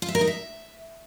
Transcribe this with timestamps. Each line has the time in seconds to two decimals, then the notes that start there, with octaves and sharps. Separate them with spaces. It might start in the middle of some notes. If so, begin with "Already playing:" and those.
0.02 F4
0.08 E5
0.15 A#4
0.21 D#4
0.27 E5